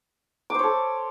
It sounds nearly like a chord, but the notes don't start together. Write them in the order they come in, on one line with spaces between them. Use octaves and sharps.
D6 C5 C#5 A4